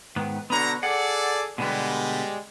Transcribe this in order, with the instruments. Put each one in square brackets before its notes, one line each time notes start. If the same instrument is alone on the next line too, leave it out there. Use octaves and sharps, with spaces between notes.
[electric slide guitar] G#2 D#3 B3
[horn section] B2 D3 A#5 [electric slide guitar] B3 D4 C#5
[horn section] G#4 A4 D5 [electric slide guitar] F#5
[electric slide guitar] B2 D3 B3 [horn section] G3 G#3